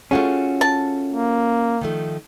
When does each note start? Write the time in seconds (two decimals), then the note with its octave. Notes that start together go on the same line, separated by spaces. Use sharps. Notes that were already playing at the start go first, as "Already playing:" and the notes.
0.11 A3 C#4 F4 F#4 G#4
0.61 A5
1.13 A#3
1.81 D#3 F3 A3